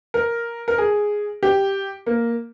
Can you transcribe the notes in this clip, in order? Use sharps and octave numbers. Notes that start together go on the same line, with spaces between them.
A#4
A#4
G#4
G4
A#3